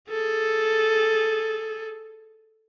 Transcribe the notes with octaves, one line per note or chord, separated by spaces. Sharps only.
G#4 A4